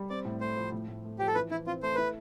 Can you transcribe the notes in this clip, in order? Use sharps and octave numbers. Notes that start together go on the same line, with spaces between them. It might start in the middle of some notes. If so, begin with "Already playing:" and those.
Already playing: G3
C4 D5
A2
A3 C5
F3
A2
A2
A3
F3 G4
A4
E3 B4
E3 E4
C4 F4
A3 C5
E4 B4